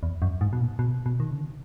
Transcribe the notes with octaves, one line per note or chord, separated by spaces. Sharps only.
E2
F#2
G#2
B2
A#2
B2
B2
D#3
C#3